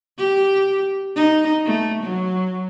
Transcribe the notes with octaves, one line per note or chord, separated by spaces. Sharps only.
G4
D#4
A3
F#3